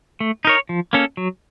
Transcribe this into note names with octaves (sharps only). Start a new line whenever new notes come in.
A3
D#4 A#4 C#5
F3
A#3 C#4 A4
F#3